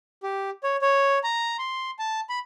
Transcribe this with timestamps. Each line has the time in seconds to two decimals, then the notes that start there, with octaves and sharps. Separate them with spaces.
0.23 G4
0.63 C#5
0.82 C#5
1.24 A#5
1.59 C6
1.99 A5
2.29 B5